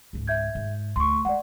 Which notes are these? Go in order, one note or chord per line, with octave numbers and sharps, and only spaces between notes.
C#2 G#2
E5 G6 G#6
G#2
D2 C6 C#6
G#3 D5 F#5